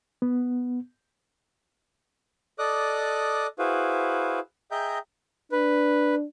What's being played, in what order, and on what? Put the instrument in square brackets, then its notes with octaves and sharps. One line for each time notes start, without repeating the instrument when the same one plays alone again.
[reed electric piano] B3
[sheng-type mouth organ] A4 D5 D#5 D6 D#6 F#6
E4 F#4 G#4 B4 C5 F5
G#4 D#5 E5 G5 A#5 G6
[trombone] D4 [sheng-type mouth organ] B4